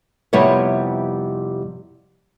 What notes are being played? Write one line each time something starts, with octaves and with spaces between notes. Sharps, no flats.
F2 C3 G3 B3 E4 C#5